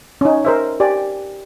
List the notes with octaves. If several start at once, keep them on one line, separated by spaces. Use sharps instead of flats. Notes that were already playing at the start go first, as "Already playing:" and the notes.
C#4 D#4
A#4 C5 E5
G4 D5 G#5